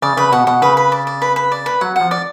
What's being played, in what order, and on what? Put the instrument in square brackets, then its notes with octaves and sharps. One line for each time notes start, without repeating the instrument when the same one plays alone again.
[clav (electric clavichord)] C#3 [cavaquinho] D5
[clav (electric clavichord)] C#3 [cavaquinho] B4
[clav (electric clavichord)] B2 [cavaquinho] F#5
[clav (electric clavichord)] B2 [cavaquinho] F#5
[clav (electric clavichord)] C#3 [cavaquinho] B4
[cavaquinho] B4
D5
D5
B4
B4
D5
B4
[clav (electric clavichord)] F#3 [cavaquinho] F#5
[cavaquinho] F#5
[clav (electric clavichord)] F3
[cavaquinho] D5